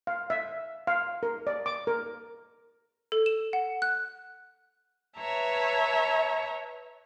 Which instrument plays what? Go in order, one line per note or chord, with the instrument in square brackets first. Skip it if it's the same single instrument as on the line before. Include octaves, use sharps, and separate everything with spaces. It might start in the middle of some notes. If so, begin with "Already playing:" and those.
[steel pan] F5
E5
F5
A#4
D5
D6
A#4
[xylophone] A4
E7
F#5
F#6
[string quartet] B4 C#5 E5 A5 A#5